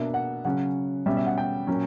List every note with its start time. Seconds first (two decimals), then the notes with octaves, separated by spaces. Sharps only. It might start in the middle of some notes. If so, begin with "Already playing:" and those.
Already playing: B2 A#3 D4 E5
0.14 F#5
0.45 C#3 F#3 C#4 F#5
1.06 B2 G3 C#4 E5
1.17 E5
1.27 F#5
1.38 G5
1.67 A#2 F#3 C#4